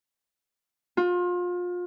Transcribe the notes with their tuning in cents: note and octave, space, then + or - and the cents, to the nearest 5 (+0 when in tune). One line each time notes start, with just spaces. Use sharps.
F4 +30